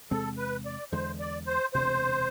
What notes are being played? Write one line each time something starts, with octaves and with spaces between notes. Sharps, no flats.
E2 C3 G#3 C4 A4
B4
D5
E2 D3 G#3 C5
D5
C5
E1 D2 C3 C5